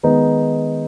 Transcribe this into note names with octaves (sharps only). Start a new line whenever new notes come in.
D#3 G#3 B3 D#4